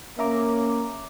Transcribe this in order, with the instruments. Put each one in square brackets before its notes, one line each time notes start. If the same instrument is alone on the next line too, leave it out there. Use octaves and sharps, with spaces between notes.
[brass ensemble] A#3 C#4 [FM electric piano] E5 A#5 D6